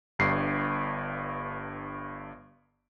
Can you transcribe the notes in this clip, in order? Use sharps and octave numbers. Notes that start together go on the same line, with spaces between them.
G1 G2 C7